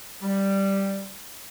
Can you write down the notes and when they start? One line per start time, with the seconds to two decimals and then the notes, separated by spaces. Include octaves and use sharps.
0.22 G3